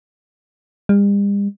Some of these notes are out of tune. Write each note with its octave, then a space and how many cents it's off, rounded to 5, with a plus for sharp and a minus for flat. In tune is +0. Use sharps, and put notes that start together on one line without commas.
G3 +45